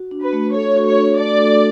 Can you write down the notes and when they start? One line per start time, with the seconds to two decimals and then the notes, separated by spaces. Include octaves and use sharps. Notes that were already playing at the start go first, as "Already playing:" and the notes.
Already playing: F#4
0.11 D4
0.22 B4
0.33 A3
0.54 A4 C#5
0.76 F#4
0.87 C#5
0.98 D4
1.19 A3 D5
1.40 A4